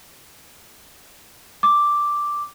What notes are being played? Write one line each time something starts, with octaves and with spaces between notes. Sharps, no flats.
D6